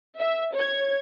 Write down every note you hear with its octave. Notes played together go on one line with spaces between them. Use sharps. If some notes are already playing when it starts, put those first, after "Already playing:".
E5
C#5 G#6